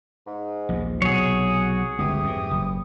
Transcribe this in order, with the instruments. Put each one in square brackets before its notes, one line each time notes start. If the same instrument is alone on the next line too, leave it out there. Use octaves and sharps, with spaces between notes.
[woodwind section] G#2
[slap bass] A#1 D#2
[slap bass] B1 C3 [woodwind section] F#4 [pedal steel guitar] G#4 C#5
[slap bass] G1 C#2 D3 [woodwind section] E3 G4 D#6
[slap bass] F2 G#2
F#1